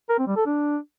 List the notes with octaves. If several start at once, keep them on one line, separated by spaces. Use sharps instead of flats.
A#4
C4
G3
A4
D4